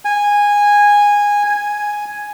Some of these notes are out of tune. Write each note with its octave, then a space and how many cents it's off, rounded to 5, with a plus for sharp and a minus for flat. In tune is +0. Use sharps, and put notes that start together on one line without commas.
G#5 -15
G#5 +0